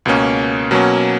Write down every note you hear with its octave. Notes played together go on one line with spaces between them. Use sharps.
C#2 B2 A#3 C#4
B2 F#3 A#3 C#4